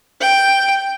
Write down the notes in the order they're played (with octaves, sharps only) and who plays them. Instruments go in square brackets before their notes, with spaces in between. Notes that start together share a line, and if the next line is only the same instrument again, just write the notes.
[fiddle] G5